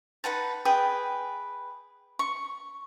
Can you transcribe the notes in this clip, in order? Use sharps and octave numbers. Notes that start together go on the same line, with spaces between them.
D#4 B4 F#5 A5
G#4 B4 G5 D#6
C#6